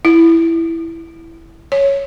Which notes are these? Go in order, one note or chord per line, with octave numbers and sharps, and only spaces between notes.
E4
C#5